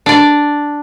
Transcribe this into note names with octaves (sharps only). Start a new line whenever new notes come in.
D4 D5